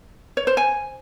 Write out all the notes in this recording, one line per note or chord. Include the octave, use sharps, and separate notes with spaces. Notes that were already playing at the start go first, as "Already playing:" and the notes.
C#5
C5
G#5